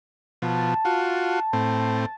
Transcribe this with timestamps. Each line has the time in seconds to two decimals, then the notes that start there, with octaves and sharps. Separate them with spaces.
0.42 B2 F3 A5
0.85 F4 F#4
1.53 A2 C4